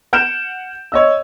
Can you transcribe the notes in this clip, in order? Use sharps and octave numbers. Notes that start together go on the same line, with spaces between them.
F#5 F6 G6 D7 E7
C#5 D#5 E6